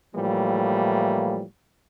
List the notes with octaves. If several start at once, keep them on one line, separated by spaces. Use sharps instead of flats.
A2 E3 F3 G3 A#3